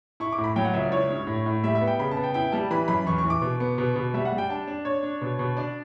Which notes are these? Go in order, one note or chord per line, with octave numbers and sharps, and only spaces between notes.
E4 C#6
D6
A2
B5
F#3 G5
F#5
C#2 E5
D5
E4 C#5
G2
A2
A2
G3 E5
E5
B3
G5
C#3 B5
A5
B3
G5
E4 G5
G3 A5
E3 B5
F#2 B5
E2 C#6
C#6
E3
D6
B2
B3
B2
B2
G3 E5
F#5
G3
G5
D4 A5
D4
D4 C#5
D4
B2
B2
D4 D5